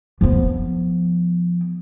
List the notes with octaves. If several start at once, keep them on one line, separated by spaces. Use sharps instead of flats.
F3 B3